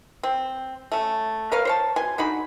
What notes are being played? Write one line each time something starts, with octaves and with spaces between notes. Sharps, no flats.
C4
A3 C#4
A#4 B4 C#5 F5
C5 C#5 A5
B2 G#5 C6
D3 D#4 F#4 B5